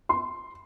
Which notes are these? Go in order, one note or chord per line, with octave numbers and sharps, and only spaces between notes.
C6